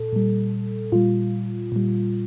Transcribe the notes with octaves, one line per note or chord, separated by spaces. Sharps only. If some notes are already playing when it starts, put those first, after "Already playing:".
Already playing: A#2 A4
A#2 G3
A#2 G3 F4
A#2 G3